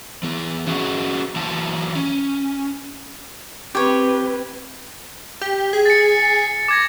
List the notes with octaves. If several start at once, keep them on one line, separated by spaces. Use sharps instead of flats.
E3 B3
C#4 F#4 G#4 B4
E3 F#3 A#3 A5
C#4
C4 G4 B4 C#5
G4
G#4
A6 C#7
D6 G#6 A#6